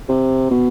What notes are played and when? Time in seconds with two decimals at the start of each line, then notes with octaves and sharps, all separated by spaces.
0.09 C3
0.50 B2